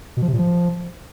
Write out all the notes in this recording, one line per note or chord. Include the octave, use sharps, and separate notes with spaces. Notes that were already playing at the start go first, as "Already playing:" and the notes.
B2
F3
C3
A#2
F3